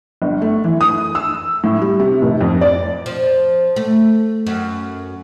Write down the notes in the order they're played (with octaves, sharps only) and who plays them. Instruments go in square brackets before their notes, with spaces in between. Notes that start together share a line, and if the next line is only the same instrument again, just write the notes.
[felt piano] G1
A3
E3
D#6
E6
A2
G3
C3
F1
F2
D5
[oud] F3
A3
F#2